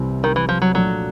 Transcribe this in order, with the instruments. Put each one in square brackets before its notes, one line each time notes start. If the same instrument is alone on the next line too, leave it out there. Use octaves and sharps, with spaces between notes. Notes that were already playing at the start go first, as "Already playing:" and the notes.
Already playing: [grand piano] C2 C3 E3 G3 C4
[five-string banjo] D#3
E3
F3
F#3
[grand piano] A#2 F3 A3 D4 [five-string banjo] F#3